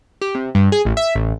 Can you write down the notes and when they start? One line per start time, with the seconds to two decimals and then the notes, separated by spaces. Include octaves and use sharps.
0.21 G4
0.35 C3
0.55 G2
0.72 G#4
0.85 A1
0.97 E5
1.16 A1